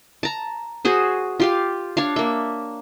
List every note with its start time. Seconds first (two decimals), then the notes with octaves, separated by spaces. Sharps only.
0.23 A5 A#5
0.85 F#4 G#4 C5
1.40 F4 G4 F5
1.97 D4 C#5 F5
2.16 A#3 E5